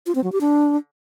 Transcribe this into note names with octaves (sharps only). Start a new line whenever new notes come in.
F4
C4
F#3
G4
D4